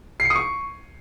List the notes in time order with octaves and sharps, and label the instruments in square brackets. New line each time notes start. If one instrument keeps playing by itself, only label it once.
[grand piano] C7
C#7
D#6
C#6